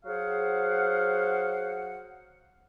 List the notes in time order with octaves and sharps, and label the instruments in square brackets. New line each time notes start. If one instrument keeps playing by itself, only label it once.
[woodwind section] F#3 G#4 C5 F5 F#5